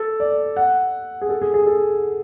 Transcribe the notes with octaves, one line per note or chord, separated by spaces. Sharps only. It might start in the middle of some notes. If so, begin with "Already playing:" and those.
Already playing: A4
D5
F#5
G#4
A4
G#4
G#4
A4